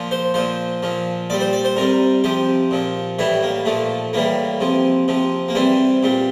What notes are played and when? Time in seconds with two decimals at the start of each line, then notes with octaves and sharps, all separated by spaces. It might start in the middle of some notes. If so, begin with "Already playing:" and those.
Already playing: A#2 F3
0.11 C5
0.34 A#2 F3 C5
0.83 A#2 F3
1.30 A#2 G3 D5
1.41 C5
1.53 D5
1.64 C5
1.76 C3 G3 A#4
2.24 C3 F3 G4
2.71 A#2 F3
3.19 A2 E3 G3 E4
3.43 A#3
3.65 A#2 F3 A3
4.13 A2 E3 G3 A#3
4.60 C3 F3
5.08 C3 F3
5.48 A#3
5.55 C3 E3 G3 C4
6.03 A#2 G3